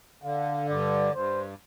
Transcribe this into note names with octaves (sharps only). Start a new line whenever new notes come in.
D3 F5
G2 D5
G2 C5